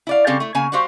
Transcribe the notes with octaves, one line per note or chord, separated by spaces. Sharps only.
E4 D5 F5
C#3 G3 C4 G4 A4 F5
A3 E4
C#3 A#3 G#5
G3 F#4 G4 C5 F5